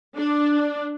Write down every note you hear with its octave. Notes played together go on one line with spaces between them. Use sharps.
D4